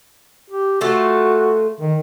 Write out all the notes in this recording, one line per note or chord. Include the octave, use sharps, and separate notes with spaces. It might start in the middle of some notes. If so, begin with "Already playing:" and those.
G4
A3 F4 F#4 A4
D#3